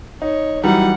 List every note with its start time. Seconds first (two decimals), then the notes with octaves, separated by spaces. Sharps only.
0.22 D#4 C#5
0.64 E3 F#3 G3 D#4 F#5